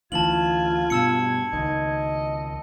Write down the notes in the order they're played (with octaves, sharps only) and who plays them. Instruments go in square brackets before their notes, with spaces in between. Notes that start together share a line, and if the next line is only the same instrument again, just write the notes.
[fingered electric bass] D2 E3 [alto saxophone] F4 [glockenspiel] A5 F#7 [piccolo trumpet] G#6
[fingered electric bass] G2 B2 [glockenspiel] A5 E6 C#7
[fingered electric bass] C#2 D#3 [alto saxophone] D#5